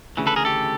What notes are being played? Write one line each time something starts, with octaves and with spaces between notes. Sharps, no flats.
D2 C#3 E3
A4 B4
G#4 A#4
G4 A4